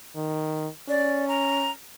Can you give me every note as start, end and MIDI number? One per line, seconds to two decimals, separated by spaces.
0.16 0.68 51
0.89 1.70 61
0.89 1.28 74
1.28 1.70 82